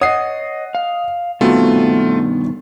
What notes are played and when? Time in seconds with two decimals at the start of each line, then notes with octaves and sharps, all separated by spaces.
0.01 C#5 D#5 F#5 D#6 C7
0.75 F5
1.41 G2 B2 D#3 A3 B3 C4 F4 F#4